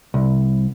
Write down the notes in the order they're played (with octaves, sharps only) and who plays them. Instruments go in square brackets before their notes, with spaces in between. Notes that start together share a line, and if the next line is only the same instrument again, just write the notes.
[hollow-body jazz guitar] C2